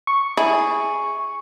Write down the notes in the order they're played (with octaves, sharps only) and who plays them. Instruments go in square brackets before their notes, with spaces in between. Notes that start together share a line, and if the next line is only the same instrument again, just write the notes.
[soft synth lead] C#6
[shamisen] E4 [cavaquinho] G#4